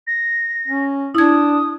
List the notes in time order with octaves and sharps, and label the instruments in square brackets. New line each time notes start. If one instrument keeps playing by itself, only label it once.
[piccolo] A#6
[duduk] C#4
[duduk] D4 [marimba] E4 G#6 [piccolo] D#6